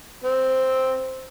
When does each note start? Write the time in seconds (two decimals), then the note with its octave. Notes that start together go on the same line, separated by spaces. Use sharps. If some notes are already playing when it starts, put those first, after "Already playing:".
0.24 C4